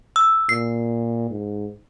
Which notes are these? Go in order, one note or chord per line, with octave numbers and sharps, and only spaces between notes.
E6
A#2 C7
G#2